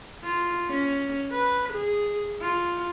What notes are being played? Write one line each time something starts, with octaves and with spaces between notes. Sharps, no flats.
F4
C#4
B4
G#4
F4